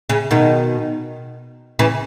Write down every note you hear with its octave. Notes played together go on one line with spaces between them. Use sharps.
C#3
B2 D#3
C#3 E3